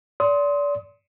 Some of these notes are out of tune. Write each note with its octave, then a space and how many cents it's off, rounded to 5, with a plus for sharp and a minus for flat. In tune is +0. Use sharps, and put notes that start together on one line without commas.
D5 -30 C6 +0 D#6 +30